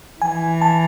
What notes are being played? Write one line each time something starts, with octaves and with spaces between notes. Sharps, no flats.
E3 G#5
A5